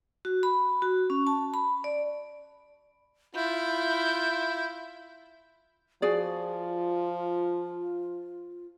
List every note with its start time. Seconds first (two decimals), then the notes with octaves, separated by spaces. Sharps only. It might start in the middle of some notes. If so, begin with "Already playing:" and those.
0.25 F#4
0.43 B5
0.82 F#4
1.10 C#4
1.27 A5
1.54 B5
1.84 D5
3.36 E4 F4 G6
6.02 F3 F4 F#4 G#4 D5